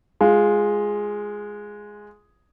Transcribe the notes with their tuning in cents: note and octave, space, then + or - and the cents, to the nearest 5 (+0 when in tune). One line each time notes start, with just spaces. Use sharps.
G#3 +0 F4 +5